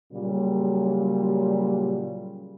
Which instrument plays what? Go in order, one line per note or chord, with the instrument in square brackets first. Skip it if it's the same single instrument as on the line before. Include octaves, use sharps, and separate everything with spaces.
[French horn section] A#2 C#3 F#3 G3